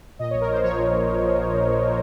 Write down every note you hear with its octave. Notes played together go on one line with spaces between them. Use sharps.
A#2 D#5
A#1 C#5
A#4
A#1 C5
F3 C#5
A#2
A#1
A#1
F3
A#2
A#1
A#1
F3